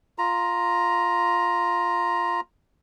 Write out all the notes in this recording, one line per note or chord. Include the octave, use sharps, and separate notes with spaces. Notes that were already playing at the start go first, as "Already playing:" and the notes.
F4 A#5